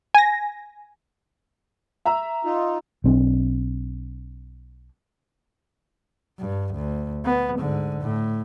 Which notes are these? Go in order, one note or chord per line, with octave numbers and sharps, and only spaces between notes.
G#5 A#6
E5 A#5 E6
D#4 F4
B1 C4 D4
G2
D2
B3
G#2 D3
A2